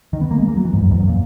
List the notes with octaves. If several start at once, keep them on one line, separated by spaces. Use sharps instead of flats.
D#3
B3
A#3
G#3
A#3
F#3
E3
G#2
F#2
E2
F#2
A#2